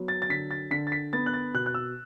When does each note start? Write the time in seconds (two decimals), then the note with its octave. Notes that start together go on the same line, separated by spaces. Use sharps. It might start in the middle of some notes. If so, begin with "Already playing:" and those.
Already playing: F#3 B3
0.08 A6
0.22 A6
0.29 D3 B6
0.51 A6
0.71 D3 B6
0.87 A6
0.92 B6
1.13 B3 A6
1.26 F#6
1.33 A6
1.54 B2 F#6
1.66 F#6
1.74 E6